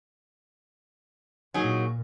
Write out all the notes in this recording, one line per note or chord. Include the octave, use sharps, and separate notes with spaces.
A#2 F#3 D#4 G#4